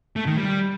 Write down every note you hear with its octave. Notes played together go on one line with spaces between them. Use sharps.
A3
D#3
G3